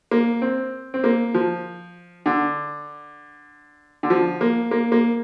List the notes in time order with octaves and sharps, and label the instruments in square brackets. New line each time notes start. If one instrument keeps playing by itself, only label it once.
[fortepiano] A#3
C4
C4
A#3
F3
D3
D3
F3
A#3
A#3
A#3